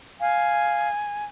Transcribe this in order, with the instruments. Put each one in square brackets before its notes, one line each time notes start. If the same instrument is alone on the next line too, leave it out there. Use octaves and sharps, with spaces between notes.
[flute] F5 [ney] G#5